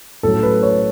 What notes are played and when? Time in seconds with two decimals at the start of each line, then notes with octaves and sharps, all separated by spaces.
0.23 A2 F#3 C#4 A4
0.43 B4
0.63 C#5